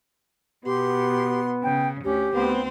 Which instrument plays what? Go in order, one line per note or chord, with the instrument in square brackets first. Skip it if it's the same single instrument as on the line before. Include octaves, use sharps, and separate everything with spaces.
[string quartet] B2 C6 [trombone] B3 [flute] G4
[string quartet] C#3 [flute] G5
[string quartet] D2 C#4 [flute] G4
[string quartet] D2 C4 C6 [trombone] B3